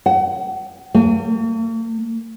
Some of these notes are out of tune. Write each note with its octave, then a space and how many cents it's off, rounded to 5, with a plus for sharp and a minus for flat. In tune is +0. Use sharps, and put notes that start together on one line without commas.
F#5 +35
A#3 -45